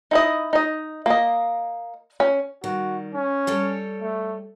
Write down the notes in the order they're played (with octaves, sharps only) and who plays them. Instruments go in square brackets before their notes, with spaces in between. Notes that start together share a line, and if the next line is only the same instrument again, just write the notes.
[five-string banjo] D#4 E4 D#5
D#4 D#5
A#3 D#5
C#4
[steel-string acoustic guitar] D#3 G3 [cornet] F#4
[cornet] C#4
[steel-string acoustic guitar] G3 A4 C#5
[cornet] A3